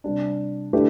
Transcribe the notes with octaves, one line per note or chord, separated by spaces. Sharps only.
C3 G3 D4
D3 A3 E4 G4 B4